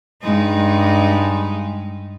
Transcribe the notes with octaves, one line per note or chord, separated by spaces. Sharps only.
G2 G#3 D#4